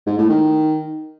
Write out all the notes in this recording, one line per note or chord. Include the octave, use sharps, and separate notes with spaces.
G#2
A2
D#3